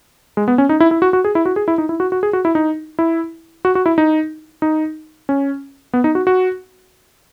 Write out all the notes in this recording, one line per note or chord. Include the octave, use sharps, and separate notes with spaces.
G#3
B3
C#4
D#4
E4
E4
F#4
F#4
G#4
E4
F#4
G#4
E4
D#4
E4
F#4
F#4
G#4
F#4
E4
D#4
E4
F#4
F#4
E4
D#4
D#4
C#4
B3
D#4
F#4
F#4